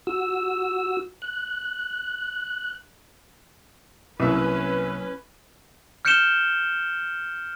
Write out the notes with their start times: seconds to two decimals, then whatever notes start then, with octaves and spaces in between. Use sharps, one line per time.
0.07 F#4 E6
1.22 F#6
4.20 C2 F#3 A#3 C#4 E4 B4 E5
6.05 F6 G6 C#7 D7 E7 G7